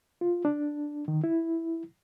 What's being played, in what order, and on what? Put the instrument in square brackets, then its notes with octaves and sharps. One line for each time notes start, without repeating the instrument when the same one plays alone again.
[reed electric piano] F4
D4
D#3
E4